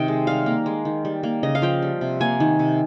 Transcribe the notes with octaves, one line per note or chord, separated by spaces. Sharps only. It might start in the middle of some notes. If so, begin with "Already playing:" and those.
Already playing: C3 D#3 D#5 G5
G#3
G3 F5
A#3
G#3
D#3
G3
A#3
C#3 D#5
F5
F3 G5
G3
C3
A#3 G#5
D#3
C3